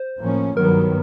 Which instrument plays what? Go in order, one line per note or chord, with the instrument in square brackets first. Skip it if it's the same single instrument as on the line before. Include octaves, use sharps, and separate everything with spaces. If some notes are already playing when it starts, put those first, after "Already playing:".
Already playing: [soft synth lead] C5
[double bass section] A2 F3 A#3 C#4
[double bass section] G2 D#3 F#3 B3 [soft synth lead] A#4